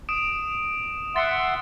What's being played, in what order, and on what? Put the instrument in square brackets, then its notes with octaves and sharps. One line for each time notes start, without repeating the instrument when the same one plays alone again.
[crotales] D#6 D7 E7
[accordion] E5 F#5 C6 [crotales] A6